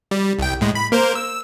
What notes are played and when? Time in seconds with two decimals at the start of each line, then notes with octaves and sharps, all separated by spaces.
0.11 G3
0.38 C2 G5
0.61 A2 G#3
0.75 B5
0.92 A#3 A#4 C5
1.15 E6